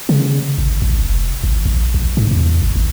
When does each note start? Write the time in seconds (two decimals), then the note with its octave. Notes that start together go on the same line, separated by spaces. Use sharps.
0.09 C#3
0.58 G#1
0.82 A#1
0.99 F1
1.44 G#1
1.65 A#1
1.94 A#1
2.17 G#2
2.31 E2
2.62 G1
2.75 G#1